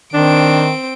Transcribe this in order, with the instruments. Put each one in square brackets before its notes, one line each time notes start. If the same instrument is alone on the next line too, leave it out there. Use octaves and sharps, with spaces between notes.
[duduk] D#3 [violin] C4 D7 [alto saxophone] D4